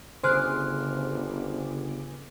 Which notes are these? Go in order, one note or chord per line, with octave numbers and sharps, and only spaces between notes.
G1 C#3 G#4 C5 C6 D6 F6 F#6